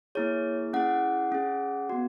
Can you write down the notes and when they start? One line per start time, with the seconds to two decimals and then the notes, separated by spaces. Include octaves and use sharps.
0.15 A#3 E4 G#4 C#5
0.73 C#4 E4 G#4 F#5
1.32 C#4 G#4
1.90 B3 F#4